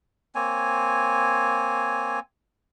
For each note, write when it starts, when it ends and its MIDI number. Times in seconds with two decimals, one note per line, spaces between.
0.35 2.20 58
0.35 2.20 60
0.35 2.20 73
0.35 2.20 80